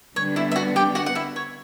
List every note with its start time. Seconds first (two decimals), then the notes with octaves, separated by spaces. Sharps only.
0.16 D3 G3 B3 D4 C#5
0.36 E4 E5
0.51 E5
0.56 F#4 F#5
0.76 G4 G5
0.95 F#4 F#5
1.06 F#5
1.15 E4 E5
1.36 C#5